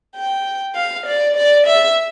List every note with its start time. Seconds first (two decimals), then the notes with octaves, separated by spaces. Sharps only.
0.16 G5
0.76 F5
1.06 D5
1.36 D5
1.67 E5